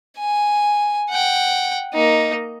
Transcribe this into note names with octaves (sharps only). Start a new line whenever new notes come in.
G#5
F#5 G5
A#3 D#4